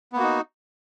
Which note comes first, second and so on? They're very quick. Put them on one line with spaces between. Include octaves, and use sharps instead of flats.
B3 A#3 F#4 D#4